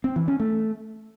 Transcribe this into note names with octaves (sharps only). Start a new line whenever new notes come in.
C4
E3
C#4
A3